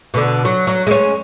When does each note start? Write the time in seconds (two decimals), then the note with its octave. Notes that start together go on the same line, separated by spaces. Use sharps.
0.14 B2 D3
0.45 F#3
0.67 F#3
0.87 G#3 C#4